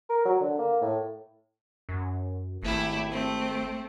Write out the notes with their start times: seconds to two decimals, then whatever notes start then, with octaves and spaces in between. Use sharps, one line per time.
0.09 A#4
0.25 F#3
0.40 D3
0.59 A#3
0.82 A2
1.89 F#2
2.63 G#1 A3 E4 G4
3.10 A3 C4